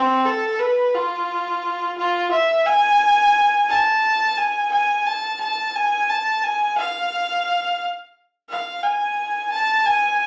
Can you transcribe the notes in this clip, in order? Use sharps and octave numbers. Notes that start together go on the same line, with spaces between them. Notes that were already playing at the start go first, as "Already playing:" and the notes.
Already playing: C4
A4
B4
F4
F4
E5
G#5
A5
G#5
G#5
A5
A5
G#5
A5
G#5
F5
F5
G#5
A5
G#5